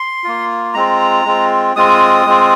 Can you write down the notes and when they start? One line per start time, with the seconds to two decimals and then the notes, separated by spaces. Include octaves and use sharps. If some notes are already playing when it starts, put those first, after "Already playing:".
Already playing: C6
0.24 A#3 F4
0.74 G#3 C4 F4 A#5
1.25 G#3 C4 F4
1.76 G#3 C4 F4 D#6
2.26 G#3 C4 F4